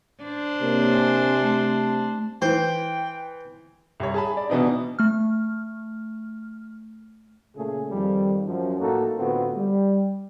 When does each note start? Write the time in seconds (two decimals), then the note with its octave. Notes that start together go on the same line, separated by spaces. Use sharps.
0.24 D4 C5
0.61 C3 A#3 A#4 C#5
0.94 G#5 A5
1.42 A3 A5
2.42 E3 C5 G5
4.00 C2 C#5
4.14 G#4 A5 B5
4.37 D5
4.50 B2 E3 B3 D4 D#4
4.99 A3 F6
7.56 A#2 C#3 A3 G#4
7.91 F2 D#3 F3 G3
8.45 F#2 F3
8.79 A2 A3 A#3 D#4 F#4 A4
9.17 A2 D3 B3 C4 F4 F#4
9.56 G3